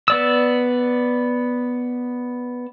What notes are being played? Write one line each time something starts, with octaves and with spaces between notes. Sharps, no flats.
B3 D5 E6